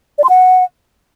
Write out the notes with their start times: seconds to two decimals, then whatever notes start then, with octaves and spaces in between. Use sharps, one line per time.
0.18 D5
0.24 C6
0.29 F#5